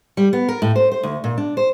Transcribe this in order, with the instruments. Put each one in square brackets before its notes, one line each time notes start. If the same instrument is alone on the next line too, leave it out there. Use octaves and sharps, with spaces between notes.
[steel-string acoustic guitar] G3
B3
A#4
A2
C5
C5
D2
A#2
D4
C5